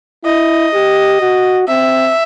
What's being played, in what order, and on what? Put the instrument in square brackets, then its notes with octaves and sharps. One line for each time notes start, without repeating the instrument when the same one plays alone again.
[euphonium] E4 [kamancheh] D#5
[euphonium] G4
F#4
[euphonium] C4 [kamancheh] E5